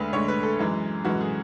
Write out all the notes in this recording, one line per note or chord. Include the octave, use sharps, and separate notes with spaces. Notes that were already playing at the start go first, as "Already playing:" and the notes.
Already playing: D2 D3 G#3 B4
D2 D3 G#3 C#5
B4
A4
F#2 E3 G#3
F#2 E3 G#3 F#4
G#4